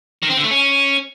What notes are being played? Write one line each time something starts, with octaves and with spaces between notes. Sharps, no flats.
D#3
C4
D3
A3
C#4